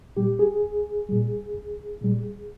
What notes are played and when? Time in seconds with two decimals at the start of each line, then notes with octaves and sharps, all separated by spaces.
0.17 A#2 G3 G4
0.39 G#4
0.63 C2
1.09 A#2 G3
1.55 C2
2.02 A#2 G3